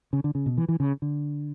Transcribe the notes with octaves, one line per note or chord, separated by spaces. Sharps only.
C#3
D3
C#3
B2
E3
E3
C#3
D3